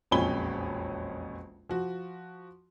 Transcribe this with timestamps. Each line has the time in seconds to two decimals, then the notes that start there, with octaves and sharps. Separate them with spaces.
0.11 E1 A#1 F2 C#4 B5 G7
1.69 F3 F#4